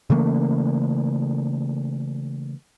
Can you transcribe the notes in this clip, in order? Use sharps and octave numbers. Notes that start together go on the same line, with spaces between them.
C#3 E3 A3 A#3